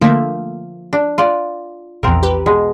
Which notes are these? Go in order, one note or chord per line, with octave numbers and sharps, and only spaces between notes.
D3 F3 A3 A#3 E5
D4
F4 D5 F#5
A#1 E2 C4 A#4
G4 B4
B2 G#3